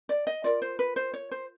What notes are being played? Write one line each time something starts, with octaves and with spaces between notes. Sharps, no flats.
D5
D#5
F4 A#4 D5
C5
B4
C5
C#5
C5